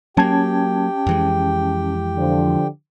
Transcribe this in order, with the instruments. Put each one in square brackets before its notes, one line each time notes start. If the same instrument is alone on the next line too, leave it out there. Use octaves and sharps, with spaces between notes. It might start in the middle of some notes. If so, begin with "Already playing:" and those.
[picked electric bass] F#3 A#3 [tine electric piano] C#4 A5 G#6 [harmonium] G4 G5
[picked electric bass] F2 E3 G#3
[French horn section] D3 F3